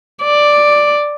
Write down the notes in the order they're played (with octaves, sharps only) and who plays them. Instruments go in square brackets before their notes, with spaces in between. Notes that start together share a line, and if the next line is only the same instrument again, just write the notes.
[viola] D5